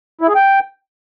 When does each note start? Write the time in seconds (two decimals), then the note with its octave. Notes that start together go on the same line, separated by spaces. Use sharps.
0.21 E4
0.28 G#4
0.35 G5